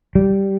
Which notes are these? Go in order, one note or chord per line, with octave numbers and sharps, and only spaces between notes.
G3